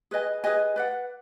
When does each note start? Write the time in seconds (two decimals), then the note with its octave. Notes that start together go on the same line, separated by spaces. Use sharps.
0.11 G#4 B4 D#5 G#5
0.44 G#4 B4 D#5 G#5
0.76 B4 D5 F#5